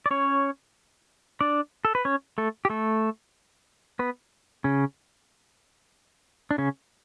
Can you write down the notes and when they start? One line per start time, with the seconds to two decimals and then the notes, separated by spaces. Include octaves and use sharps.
0.06 D5
0.11 C#4 C#5
1.41 D4 D5
1.85 A4
1.95 B4
2.05 C#4 C#5
2.38 A3 A4
2.65 G4
2.70 A3 A4
3.99 B3 B4
4.64 C#3 C#4
6.51 D4
6.58 C#3 C#4